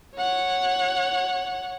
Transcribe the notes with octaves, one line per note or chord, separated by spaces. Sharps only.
C#5 F#5